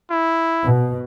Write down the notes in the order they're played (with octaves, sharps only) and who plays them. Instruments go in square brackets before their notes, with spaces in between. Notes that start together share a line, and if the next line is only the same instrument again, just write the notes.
[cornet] E4
[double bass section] B2